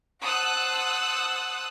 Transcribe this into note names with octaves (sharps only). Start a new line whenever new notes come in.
C5 F#5 A5 D#6 E6 F#6